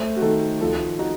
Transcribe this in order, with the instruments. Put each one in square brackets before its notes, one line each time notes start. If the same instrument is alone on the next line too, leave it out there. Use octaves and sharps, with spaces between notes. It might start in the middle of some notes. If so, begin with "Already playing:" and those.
Already playing: [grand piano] A3 [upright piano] C5
[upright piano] F#4
[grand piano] D#3 [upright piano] A4
[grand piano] F3 [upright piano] A4
[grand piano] D#4 [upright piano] F#4